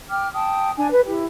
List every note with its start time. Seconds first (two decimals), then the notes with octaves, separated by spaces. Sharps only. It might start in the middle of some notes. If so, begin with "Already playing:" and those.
0.10 G5 D6 F6
0.34 G5 A5 D#6
0.77 D4 G#5
0.91 B4
1.07 E4 G4